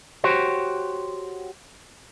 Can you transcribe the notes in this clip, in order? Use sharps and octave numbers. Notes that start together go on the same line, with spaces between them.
F#4 G4 C5 C#5